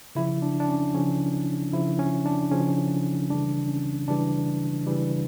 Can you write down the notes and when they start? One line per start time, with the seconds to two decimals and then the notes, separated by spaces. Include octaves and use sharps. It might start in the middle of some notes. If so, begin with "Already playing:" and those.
0.15 C#3 F3 E4
0.42 D4
0.60 D4
0.68 C#4
0.94 C#3 F3 C#4
1.73 C#3 F3 E4
1.99 C#4
2.25 D4
2.51 C#3 F3 C#4
3.30 C#3 E3 G3 D4
3.69 C#4
4.08 C#3 E3 G3 D4
4.87 C#3 E3 G3